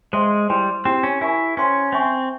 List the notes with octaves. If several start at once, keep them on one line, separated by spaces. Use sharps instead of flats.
G#3 C5 E5 G5 C6
G3 E4 G4 C5 G5 C6
C4 E4 G4 C5
C#4
E4 A#4 E5 G#5 C#6
C#4 C5 G5 C6
C4 C5 E5 G#5 C#6